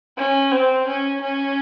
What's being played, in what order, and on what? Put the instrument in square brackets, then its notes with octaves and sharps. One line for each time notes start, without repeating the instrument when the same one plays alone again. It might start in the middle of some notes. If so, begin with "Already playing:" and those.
[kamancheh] C#4
C4
C#4
C#4